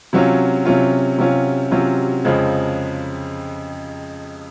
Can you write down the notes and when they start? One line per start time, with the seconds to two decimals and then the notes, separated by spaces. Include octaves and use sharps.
0.13 C3 F#3 C#4 F4
0.65 C3 F#3 C#4 F4
1.19 C3 F#3 C#4 F4
1.71 C3 F#3 C#4 F4
2.25 F2 C#3 F3 G#3